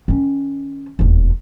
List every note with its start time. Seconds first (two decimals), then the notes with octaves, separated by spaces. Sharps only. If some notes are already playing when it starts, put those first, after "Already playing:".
0.08 D#3 C#4
0.99 E1 D#2